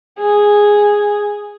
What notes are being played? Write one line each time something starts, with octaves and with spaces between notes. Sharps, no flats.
G#4